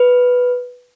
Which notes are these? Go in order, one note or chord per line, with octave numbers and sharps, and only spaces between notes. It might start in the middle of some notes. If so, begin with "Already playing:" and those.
Already playing: B4